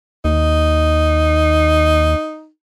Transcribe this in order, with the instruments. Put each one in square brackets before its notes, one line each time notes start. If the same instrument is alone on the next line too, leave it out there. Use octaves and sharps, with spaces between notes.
[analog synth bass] D#2 [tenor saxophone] D#4